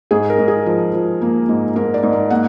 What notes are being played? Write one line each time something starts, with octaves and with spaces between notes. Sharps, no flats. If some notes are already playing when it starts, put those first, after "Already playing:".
G#2 G#4
A#4
G#2
G#4
F3
F3
A#3
G#2
G#2 A#4
D5
G#2
A#4
A#3 F#5